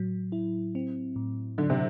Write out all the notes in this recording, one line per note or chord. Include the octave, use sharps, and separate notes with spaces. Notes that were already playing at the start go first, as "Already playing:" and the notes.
Already playing: A2 F#3
E4
C4
A2
D3 F#3
C3